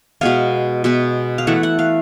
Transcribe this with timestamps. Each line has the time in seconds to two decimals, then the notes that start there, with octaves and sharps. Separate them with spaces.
0.21 B2 G#3 B3 F5
0.84 B2 G#3 B3
1.38 F5
1.47 E3 A3 F#5
1.63 F#5
1.79 F5